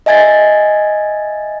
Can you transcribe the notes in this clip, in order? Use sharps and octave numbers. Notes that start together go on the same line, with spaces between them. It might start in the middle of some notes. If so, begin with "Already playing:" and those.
D#5 E5 G#5 G#6 A6